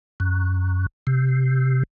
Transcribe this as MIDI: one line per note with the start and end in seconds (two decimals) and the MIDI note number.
0.20 0.86 42
1.07 1.83 48